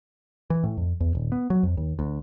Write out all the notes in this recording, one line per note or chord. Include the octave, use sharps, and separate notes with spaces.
E3
A2
F2
E2
D#1
B3
F#3
F2
D#2
D2